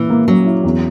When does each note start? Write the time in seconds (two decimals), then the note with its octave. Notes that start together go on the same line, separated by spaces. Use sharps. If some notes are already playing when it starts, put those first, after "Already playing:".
Already playing: A#2 E3 C#4 E4
0.10 A#3
0.28 F#3 C#4
0.46 E4
0.64 E2